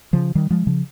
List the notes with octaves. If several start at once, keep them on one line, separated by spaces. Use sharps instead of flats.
C#3 F3
D#3 G3
F3 G#3
C#3 F3